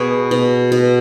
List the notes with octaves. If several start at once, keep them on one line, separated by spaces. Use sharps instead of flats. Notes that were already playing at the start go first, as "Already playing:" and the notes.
Already playing: B2 F#4 G#4 B4
B2
B2